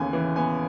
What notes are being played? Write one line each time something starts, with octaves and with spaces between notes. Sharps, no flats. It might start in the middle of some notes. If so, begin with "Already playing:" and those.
Already playing: D#2 C#3 E3 B3 G#5
E3
B3 G#5